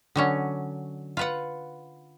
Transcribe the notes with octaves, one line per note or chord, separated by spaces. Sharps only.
D3 F#3 C#4
F4 B4 F#5